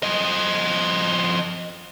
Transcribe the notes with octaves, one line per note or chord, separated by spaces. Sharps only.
F3 D#5